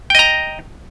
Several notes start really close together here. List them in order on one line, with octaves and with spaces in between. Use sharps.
G5 D#5 A#5